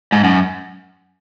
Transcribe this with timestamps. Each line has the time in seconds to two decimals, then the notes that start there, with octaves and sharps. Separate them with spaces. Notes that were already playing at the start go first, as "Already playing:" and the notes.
0.12 G#2
0.24 F#2